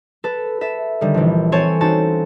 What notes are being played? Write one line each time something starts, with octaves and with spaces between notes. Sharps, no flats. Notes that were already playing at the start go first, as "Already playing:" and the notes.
A4 B4
A4 E5
D3 D#3 G3
A#1 E3
C4 A4 C#5 G#5
C4 C#4 D#4 F#4 A5